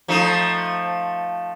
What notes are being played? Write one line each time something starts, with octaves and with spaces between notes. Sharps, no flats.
F3 A3 D#4